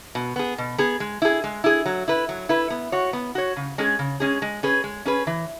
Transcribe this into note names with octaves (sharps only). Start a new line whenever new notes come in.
B2
B3 G#4
B2
B3 G#4
G#3
E4 G#4
G#3
E4 G#4
F#3
E4 B4
F#3
E4 B4
B3
F#4 C#5
B3
F#4 C#5
C#3
G#3 C#4 G#4
C#3
G#3 C#4 G#4
G#3
C#4 G#4 B4
G#3
C#4 G#4 B4
E3